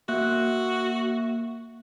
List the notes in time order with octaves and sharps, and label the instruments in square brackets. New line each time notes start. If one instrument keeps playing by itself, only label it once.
[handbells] A#3 E5 F#6 [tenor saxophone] F#4